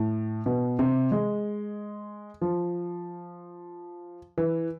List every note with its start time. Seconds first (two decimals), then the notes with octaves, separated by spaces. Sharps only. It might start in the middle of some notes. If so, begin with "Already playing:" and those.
Already playing: A2
0.46 B2
0.79 C3
1.12 G#3
2.41 F3
4.38 E3